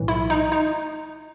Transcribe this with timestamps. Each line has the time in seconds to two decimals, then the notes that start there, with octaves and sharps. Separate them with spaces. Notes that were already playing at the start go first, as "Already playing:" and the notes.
Already playing: B1 A2 E3
0.08 E4
0.30 D#4
0.52 D#4